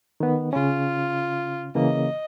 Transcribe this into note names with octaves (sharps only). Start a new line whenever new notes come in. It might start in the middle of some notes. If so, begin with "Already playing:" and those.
D#3 B3
C#3 C#4 F4
C#3 E3 A#3 D#5